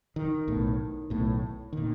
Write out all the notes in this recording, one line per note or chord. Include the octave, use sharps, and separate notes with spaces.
D#3
B1 A2
B1 A2
A#2 D#3